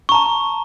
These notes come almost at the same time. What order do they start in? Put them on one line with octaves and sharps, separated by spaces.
C#6 A#5 A5